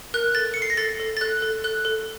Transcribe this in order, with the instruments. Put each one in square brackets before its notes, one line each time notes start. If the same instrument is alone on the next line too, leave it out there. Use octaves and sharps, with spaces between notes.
[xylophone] A#4 F#6
A4 A6
C#7
A4 C7
A#6
A4 A6
A4
A6
A4 F#6
A4
A4 F#6
A4